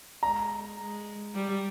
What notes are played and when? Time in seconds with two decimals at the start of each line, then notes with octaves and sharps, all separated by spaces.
0.22 G#3 A#5
0.79 G#3
1.34 G3